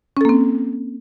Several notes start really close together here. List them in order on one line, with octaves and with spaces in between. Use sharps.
C#4 A4 A#3 C4